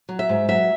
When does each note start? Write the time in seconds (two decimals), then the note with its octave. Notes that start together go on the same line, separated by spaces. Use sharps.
0.09 F#3
0.19 E5
0.29 G#2
0.49 F#3 E5